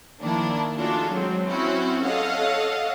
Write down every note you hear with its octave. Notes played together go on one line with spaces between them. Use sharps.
D#3 F3 A#3 D4 E4
D4 D#4 F4 F#4 G#4 A4
F#3 G#3 C4
C4 C#4 E4 F#4
A4 C#5 D#5 F5 F#5